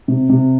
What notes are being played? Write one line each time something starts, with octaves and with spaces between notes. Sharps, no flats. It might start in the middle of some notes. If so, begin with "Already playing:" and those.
C3
C3